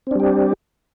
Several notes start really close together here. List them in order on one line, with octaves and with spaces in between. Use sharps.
C4 D4 G3 G4